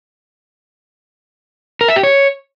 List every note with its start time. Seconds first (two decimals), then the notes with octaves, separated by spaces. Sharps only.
1.81 A#4
1.88 E5
1.96 G4
2.03 C#5